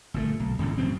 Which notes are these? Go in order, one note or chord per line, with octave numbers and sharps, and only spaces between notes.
G1 A#2 A3
B1
D#1 G#1 C#2 A2
F1 F#2 B2 C4